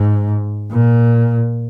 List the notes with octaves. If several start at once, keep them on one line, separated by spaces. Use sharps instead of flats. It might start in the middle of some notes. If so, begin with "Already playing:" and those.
Already playing: G#2
A#2